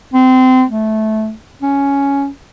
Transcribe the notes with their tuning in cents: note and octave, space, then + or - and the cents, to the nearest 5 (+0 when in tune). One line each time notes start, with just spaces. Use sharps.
C4 -25
A3 -15
C#4 +5